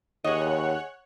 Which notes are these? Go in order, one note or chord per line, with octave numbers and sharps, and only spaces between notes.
D#2 G#4 C#5 D#5 F#5 F#6